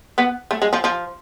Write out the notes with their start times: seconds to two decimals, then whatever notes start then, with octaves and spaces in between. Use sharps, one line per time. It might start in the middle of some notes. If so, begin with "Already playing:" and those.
0.18 B3
0.51 A3
0.62 G#3
0.73 F3
0.84 F3